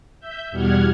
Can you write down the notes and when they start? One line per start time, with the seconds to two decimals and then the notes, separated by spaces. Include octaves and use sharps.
0.20 E5 G6
0.50 E2 B2 G3 F#5 F6 G#6